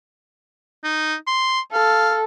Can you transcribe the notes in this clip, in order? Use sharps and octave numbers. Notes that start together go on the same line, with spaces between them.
D#4
C6
A4 F5